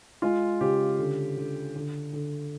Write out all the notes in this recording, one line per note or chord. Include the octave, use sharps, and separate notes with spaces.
G#3 F4
C#3 G4
D3
D3
D3
D3